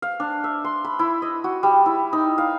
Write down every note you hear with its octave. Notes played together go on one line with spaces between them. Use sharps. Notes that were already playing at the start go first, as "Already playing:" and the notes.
F5
D4
E5
C6
B5
E4
D#5
F#4
G3
E4
D#4
F5